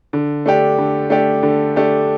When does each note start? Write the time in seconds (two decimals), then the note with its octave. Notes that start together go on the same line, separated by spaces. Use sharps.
0.13 D3
0.46 A3 D4 G4
0.78 D3
1.10 A3 D4 G4
1.43 D3
1.76 A3 D4 G4